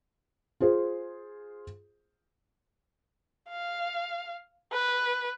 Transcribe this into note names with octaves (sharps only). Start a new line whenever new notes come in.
F4 G#4 C5
F5
B4